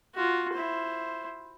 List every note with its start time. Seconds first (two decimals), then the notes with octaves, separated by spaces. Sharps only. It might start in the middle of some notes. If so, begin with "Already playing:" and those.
0.15 F4 F#4
0.53 E4 C5